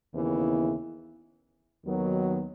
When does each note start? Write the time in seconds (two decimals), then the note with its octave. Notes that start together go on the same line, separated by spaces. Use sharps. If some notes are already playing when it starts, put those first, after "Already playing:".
0.13 D#2 C#3 E3 B3 E4
1.85 D#2 D#3 F#3 B3